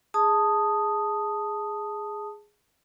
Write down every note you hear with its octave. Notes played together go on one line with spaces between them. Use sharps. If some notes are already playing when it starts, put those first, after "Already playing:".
G#4 A5 D#6